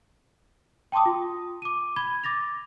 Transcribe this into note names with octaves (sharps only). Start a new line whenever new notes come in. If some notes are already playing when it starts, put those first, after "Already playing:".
G5 A5 C6 D6 D#6
F4
D6 D#7
B5 G#6 G7
D6 A6 A#6 F7